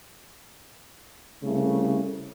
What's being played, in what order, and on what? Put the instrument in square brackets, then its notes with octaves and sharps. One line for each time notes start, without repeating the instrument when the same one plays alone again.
[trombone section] C2 C#3 A3